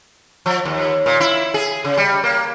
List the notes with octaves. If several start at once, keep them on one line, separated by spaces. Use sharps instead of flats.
F3
D#2
A#2
E4
G#4
C#3
G3
A#3